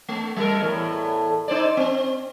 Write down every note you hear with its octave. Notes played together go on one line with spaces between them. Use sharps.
A3
G3 A#4
E2 A2
D#4 C5 D5
C4